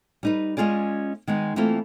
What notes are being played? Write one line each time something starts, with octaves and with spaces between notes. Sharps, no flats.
G3 D#4 B4
G#3 C#4 F4 G#4 D5
D#3 G#3 B3 D#4
E3 A3 A#3 C4 E4 F4